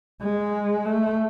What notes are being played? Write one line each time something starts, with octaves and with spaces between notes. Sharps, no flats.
G#3
A3